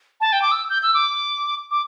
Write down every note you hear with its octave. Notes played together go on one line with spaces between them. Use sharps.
A5
G5
D6
E6
G6
E6
D6
D6